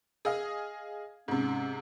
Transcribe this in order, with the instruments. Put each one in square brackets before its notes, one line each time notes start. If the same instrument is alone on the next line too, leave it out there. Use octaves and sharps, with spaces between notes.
[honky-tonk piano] G#4 D#5 F5
[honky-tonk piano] G#2 C3 [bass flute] C#4